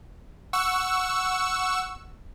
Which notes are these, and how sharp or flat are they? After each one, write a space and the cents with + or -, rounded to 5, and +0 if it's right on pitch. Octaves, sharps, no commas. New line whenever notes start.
F#5 +0 C#6 +0 E6 +0